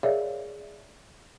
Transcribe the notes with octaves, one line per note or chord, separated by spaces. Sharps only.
G#4 A#4 C#5 D5 E5 F5